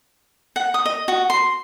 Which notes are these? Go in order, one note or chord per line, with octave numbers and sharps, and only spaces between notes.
F#5
D#6
D#5
F#4
C6